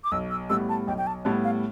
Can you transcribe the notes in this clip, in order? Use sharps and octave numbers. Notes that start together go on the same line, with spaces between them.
D6
B1 E6
E6
A2 G3 B3 E6
A5
B1 G5
G5
A5
A2 G3 B3 A5
F5